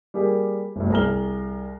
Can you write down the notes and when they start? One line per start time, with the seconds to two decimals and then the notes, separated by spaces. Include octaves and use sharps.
0.14 G3 A#3 G4 G#4
0.76 G1 D2
0.90 C2 G#4 A#5 F6 G7